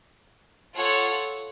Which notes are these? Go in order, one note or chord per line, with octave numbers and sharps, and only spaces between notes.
F4 A4 C#5 F#5